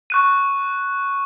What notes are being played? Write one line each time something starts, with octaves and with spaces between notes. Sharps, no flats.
C#6 F#6 D#7